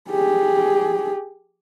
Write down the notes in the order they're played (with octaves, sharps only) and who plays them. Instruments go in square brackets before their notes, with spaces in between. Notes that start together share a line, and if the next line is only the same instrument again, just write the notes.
[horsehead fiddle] G4 G#4